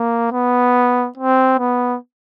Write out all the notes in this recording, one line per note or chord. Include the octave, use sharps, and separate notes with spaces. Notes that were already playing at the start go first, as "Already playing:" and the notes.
Already playing: A#3
B3
C4
B3